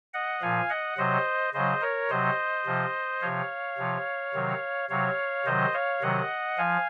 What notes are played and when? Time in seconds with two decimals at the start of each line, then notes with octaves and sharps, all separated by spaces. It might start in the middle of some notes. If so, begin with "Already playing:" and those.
0.14 D#5 F#5
0.42 A#2 F3 F5 G#5
0.70 D#5 F#5
0.98 C3 F#3 C5 D#5
1.53 C#3 F#3 C5 D#5
1.81 A#4 C#5
2.10 C3 F#3 C5 D#5
2.66 C3 F3
3.21 C3 F3 C#5 F5
3.78 C3 F3
4.34 C3 D#3 F#3
4.90 C3 F#3 C#5 F5
5.45 C3 D#3 F#3 C5 D#5
5.74 C#5 F5
6.02 C3 D#3 F#3 D#5 F#5
6.58 F3 F5 G#5